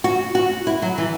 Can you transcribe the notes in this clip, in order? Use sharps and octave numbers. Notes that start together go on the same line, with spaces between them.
F#4
F#4
E4
F#3
E3